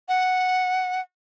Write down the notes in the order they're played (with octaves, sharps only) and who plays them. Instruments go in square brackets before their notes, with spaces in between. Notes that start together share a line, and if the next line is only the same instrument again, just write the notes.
[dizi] F#5